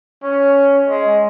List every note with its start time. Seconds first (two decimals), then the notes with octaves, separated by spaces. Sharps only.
0.23 C#4
0.88 G#3